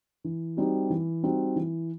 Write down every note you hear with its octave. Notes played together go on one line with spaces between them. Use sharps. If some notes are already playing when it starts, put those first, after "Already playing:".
E3
G3 C4 D#4 F#4
E3
G3 C4 D#4 F#4
E3